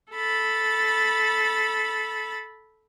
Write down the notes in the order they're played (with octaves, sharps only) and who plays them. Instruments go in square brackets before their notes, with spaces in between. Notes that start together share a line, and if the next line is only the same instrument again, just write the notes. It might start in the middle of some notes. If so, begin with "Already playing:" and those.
[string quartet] A4 B5 A6